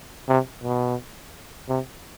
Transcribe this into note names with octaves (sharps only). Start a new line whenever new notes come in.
C3
B2
C3